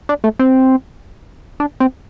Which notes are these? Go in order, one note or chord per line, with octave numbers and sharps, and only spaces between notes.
D4
A3
C4
D4
C4